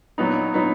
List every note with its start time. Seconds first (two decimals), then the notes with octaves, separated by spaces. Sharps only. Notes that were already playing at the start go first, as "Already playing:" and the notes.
0.18 A#2 F#3 B3 D#4
0.54 A#2 F#3 B3 D#4